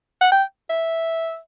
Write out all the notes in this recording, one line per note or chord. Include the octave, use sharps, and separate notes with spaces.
F#5
G5
E5